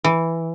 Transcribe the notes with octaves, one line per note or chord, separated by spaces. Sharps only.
E3